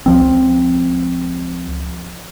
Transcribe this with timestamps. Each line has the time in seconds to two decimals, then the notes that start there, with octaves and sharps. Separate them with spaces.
0.06 C#2 F3 C4